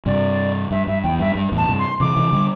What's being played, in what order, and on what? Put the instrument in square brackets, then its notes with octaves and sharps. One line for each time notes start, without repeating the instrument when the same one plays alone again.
[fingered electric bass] G2 C3 [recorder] D5
[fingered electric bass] G2 [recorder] E5
[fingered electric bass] G2 [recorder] E5
[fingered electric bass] E2 [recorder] G5
[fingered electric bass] G2 [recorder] E5
[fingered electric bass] G2
E2 A2
[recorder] A5
[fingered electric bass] G2 C3
[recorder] C6
[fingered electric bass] C3 E3 [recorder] D6
[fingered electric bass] C3 E3
D3 G3